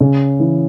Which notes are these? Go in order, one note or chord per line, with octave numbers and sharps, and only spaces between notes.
C#3
E3